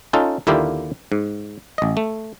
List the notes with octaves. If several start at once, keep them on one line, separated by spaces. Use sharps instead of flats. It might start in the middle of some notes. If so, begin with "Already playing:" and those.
C#4 D#4 F4 A4
D#2 D3 A#3 E4 F4 G4
G#2
A1 D#5
A3